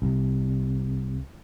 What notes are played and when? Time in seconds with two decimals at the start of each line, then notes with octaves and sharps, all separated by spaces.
0.02 C2